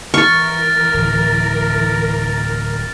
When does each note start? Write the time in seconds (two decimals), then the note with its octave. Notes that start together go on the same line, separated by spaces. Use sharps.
0.14 E3 A#4 C#6 F6 A6
0.94 D1